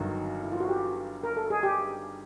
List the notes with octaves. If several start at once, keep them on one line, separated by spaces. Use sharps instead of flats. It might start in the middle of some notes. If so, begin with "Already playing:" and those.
Already playing: G1 G2 D#3 F#3
E4
F4
F#4
G4
A#4
A4
G#4
G4